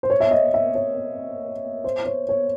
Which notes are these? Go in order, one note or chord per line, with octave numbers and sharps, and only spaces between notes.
C5
C#5
E5
D#5
E5
C#5
C5
C#5
C#5